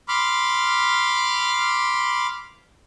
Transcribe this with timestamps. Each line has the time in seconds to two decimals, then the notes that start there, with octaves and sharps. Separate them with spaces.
0.08 B5 C6 D6 F6